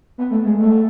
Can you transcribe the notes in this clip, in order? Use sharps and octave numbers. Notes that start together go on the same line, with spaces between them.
B3
A3
G#3
A3